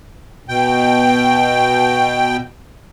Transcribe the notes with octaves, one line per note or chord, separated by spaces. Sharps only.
B2 G5